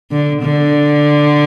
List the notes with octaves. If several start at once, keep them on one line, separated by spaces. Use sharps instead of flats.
D3
D3